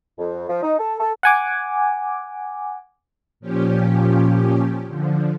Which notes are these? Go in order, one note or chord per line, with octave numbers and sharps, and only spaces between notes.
F2
F3
D#4
A4
A4
F#5 G#5 D6
A#2 F3 C#4 G4
D3 F3